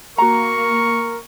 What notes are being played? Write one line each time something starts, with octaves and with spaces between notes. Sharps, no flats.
A#3 F#4 A#4 A#5 C#6